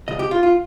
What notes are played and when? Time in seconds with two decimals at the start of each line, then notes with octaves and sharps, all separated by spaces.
0.08 C#2 C3 D#5
0.19 G4
0.31 F4
0.43 F4